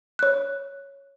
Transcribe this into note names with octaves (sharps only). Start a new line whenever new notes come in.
C#5 F#6